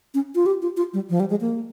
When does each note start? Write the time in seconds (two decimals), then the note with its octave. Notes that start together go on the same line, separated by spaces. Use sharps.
0.14 C#4
0.35 F4
0.46 G4
0.62 F4
0.77 F4
0.94 G3
1.10 F3
1.20 G3
1.30 G#3
1.41 A#3